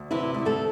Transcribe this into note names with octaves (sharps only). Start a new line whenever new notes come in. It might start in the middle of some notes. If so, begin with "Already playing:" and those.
Already playing: D2
C3 E3 E4
D2
A3 A4